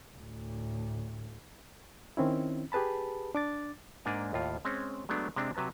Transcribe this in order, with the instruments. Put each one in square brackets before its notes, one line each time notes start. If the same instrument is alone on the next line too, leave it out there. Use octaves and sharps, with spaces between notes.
[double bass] D2 A2
[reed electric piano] D#3 C4 C#4 E4
G4 G#4 B4 A5 B5
D4 D6 A6
[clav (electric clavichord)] G#2 A#3 D4 D5 G#5 A#5
D#2 A2 F4
G#3 C4 C#4
F#3 G#3 A3 B3 D4
C3 G#3 C4 D4
C3 F#3 B4 A5 A#5